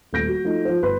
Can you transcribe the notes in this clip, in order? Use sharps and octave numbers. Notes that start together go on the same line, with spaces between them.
D#1 A3 G6 A#6 D7
F#4
F3 A3 D#4
F3 C5
G1 B4 C6